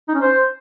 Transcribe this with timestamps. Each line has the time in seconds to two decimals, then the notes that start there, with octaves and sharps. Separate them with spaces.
0.08 D#4
0.15 C#4
0.21 C5